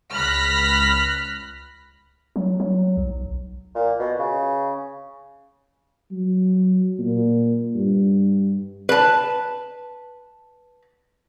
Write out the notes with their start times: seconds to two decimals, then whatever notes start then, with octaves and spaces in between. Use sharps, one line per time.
0.11 C#2 B5 F6 F#6 A#6 B6
2.36 F#3
2.60 F#3
2.97 B1
3.75 A#2
4.00 B2
4.19 C#3
6.11 F#3
6.98 A#2
7.75 G2
8.89 B4 A5